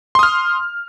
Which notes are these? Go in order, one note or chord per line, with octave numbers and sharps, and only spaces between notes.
C6 D#6 F6